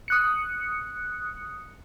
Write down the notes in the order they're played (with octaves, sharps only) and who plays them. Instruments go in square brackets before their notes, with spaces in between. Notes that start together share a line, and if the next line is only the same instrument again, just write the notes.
[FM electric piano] D#6 F#6 C#7